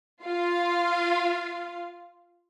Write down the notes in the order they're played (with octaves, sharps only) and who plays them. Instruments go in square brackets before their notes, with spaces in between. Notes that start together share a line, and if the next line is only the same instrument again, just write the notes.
[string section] F4 F5